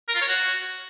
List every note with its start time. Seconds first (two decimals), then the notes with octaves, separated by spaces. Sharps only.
0.08 A#4
0.15 F4
0.21 C#5
0.28 F#4